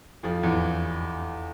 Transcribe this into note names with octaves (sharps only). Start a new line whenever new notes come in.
F2 F3
E2 E3